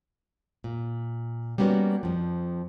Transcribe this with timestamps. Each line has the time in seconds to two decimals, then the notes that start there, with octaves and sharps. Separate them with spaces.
0.64 A#2
1.58 G3 A#3 B3 C#4 F#4
2.03 F2 F3